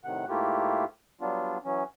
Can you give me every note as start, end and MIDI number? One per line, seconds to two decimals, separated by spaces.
0.04 0.25 45
0.04 0.25 48
0.04 0.25 51
0.04 0.25 78
0.29 0.85 44
0.29 0.85 57
0.29 0.85 58
0.29 0.85 64
0.29 0.85 65
0.29 0.85 67
1.21 1.58 54
1.21 1.58 55
1.21 1.58 59
1.21 1.58 62
1.21 1.58 65
1.65 1.84 52
1.65 1.84 54
1.65 1.84 61